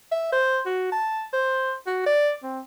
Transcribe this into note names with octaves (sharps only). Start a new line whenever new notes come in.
E5
C5
F#4
A5
C5
F#4
D5
C4